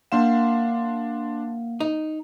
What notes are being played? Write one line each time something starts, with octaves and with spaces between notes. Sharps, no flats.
A#3 D4 F5 F#5 C6 E7
D#4